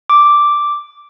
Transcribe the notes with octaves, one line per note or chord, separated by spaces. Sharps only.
D6